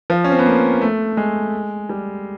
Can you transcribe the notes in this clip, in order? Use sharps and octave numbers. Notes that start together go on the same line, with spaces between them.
F3
C#4
C4
B3
A#3
A3
G#3
G3